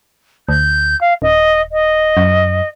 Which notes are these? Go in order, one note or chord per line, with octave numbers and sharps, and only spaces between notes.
D2 G6
F5
D#1 D#5
D#5
F#2